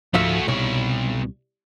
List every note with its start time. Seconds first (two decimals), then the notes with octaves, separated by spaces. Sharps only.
0.14 G#2 F3 A3 F#4 E5
0.48 C2 B2 C#5